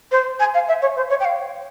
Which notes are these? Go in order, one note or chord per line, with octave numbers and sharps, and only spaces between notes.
C5
G#5
F5
E5
C#5
C5
C#5
G5
F5